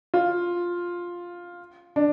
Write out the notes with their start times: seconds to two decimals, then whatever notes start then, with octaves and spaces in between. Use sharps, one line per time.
0.14 F4
1.96 D4